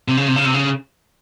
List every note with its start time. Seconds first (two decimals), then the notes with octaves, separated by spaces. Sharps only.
0.08 C3
0.17 C#3
0.28 C3
0.36 C#3
0.45 C3
0.54 C#3